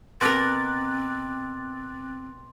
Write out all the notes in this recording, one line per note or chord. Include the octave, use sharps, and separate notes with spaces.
B2 C4 A#4 C6 D6 F#6 A6